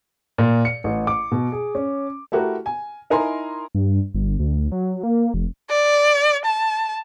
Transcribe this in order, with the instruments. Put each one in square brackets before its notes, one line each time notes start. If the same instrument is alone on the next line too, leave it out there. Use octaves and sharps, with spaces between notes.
[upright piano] A#2
C#7
A1
D6
B2
G#4
C#4
A3 E4 F#4 G4 A#4
G#5
D#4 E4 A#4 G#5 A#5 C6
[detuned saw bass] G2
G1
D2
F#3
A#3
F1
[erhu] D5
A5